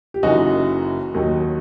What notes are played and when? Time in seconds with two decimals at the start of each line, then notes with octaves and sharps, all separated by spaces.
0.14 G4
0.23 F#1 F#2 E3 D#4 F#4
1.14 D#2 D#3 F#3